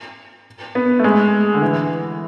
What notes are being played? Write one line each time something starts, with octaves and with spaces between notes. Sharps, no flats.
B3
A3
G#3
D3
E3